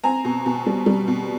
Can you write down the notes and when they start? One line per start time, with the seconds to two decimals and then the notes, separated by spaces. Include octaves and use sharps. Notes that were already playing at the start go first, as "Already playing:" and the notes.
0.04 C4 G#5 A#5
0.25 B2
0.46 B2
0.66 G3
0.86 G3
1.07 B2